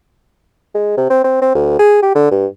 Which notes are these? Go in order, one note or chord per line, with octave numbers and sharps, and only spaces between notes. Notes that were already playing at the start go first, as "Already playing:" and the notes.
G#3
C3
C4
C4
C4
D2
G#4
G4
D3
G2